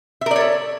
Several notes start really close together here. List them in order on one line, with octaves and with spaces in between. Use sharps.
E5 A#4 D5 C#5 A4